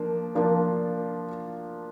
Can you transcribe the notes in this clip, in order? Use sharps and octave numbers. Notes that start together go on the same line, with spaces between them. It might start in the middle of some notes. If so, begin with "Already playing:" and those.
Already playing: F3 A#3 D4
F3 A#3 D4 F4